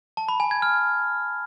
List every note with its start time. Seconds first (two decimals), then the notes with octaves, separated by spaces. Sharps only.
0.17 A5
0.29 B5
0.40 G#5
0.51 G#6
0.62 F6